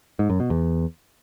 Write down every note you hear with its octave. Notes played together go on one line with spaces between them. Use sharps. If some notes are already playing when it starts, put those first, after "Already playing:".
G#2
F#2
B2
E2